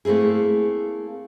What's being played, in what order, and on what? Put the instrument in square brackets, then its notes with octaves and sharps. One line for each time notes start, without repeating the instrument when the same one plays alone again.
[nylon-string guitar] A3 A#3 C4 E4 G#4